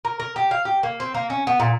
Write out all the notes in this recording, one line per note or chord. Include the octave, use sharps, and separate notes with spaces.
A#4
A#4
G4
F5
G4
A#3
C4
A#3
C#4
B3
A#2